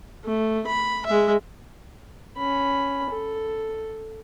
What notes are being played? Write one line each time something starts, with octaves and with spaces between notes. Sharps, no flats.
A3
B5
G#3 E5
C#4 B5
A4